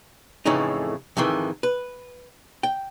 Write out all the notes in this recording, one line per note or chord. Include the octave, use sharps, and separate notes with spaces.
F2 A2 C#3 E3 A3 D#4
F2 G#2 D#3 E3
B4
G5